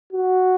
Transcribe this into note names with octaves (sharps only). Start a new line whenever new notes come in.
F#4